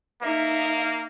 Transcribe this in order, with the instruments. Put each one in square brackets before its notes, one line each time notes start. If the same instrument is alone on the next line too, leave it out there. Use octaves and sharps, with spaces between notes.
[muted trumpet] A#3 [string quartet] D#4 E5 F5